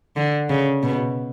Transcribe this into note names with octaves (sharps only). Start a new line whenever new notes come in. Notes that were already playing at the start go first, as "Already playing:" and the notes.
D3
C#3
B2